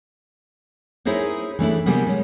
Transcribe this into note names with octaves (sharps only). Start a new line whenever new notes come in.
D#4 E4 G#4 A#4 C5 C#5
E3 A3 D4 E4
C3 G3 A#3 B3 G#4
G#3 C#4